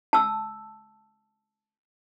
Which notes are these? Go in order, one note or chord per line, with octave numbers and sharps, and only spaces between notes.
A5 E6